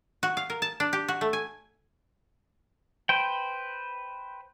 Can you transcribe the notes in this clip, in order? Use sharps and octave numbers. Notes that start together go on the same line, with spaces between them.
F#4
F5
A#4
A5
D4
G4
F#4
A3
G#5
B4 C5 G5